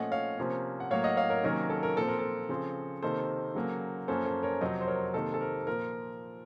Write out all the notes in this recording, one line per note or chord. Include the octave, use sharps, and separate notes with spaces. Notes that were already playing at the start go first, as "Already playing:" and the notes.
Already playing: A#2 F3 A3 C#4 D#5 F#5
C#5 F5
C3 F3 A#3 C#4
F#5
A2 F#3 A#3 C#5 F5
D#5 F#5
C#5 F5
A#4 C#5
C3 D#3 F#3 A#3 C#4 A#4
A4
A#4
A#2 F3 C4 A4
A#4
A4
C#3 F3 C4
C3 D#3 A#3 A4 C5
C#3 F#3 A#3
F#2 F3 A#3 C#4 A4 C5
A4 C5
A#4 C#5
F2 C3 F#3 C4 C5 D#5
C5
A#4 C#5
C3 D#3 A#3 A4 C5
A4
A#4
A#2 F3 A#4